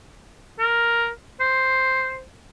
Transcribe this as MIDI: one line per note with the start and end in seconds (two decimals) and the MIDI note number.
0.59 1.09 70
1.40 2.23 72